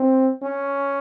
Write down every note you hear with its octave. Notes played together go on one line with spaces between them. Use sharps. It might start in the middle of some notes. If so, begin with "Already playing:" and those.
Already playing: C4
C#4